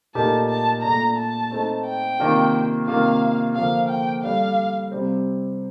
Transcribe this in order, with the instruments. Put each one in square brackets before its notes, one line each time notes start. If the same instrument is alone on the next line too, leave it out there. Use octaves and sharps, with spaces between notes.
[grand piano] A#2 A3 D#4 G4 A#4 [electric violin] A5
[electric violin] A5
[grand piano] A#2 A3 D4 [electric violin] A#5
[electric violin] A5
[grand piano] A3 C4 D#4
[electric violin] G5
[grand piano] C3 D#3 A#3 D4 F4
[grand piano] C3 D#3 A#3 F4 [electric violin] F5
[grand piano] D3 F3 A#3 [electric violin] F5
[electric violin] G5
[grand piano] G3 D4 A4 [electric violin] F5
[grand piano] C3 G3 C4